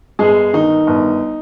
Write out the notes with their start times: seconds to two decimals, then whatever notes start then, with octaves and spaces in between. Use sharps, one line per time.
0.19 G1 G#3 G#4
0.53 D#3 D#4
0.87 G1